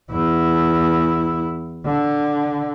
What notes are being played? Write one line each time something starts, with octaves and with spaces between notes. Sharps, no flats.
E2 E4
D3